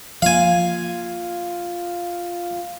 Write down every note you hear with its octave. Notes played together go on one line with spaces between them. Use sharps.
F3 A#3 F4 F5 G#5